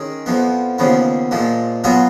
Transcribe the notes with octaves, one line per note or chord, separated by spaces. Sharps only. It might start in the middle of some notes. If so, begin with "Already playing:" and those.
Already playing: D#3 G#3 C#4 G#4
F2 F3 B3
D#2 C#3 F3 B3
A#2 F3 G#3
B2 F#3 B3 F4 G#4